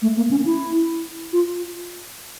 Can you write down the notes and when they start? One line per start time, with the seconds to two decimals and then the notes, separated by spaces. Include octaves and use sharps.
0.02 A3
0.17 A#3
0.31 C#4
0.45 E4
1.33 F4